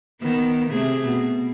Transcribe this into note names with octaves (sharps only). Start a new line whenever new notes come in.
D#3 B3
C3 A3 G#4
B2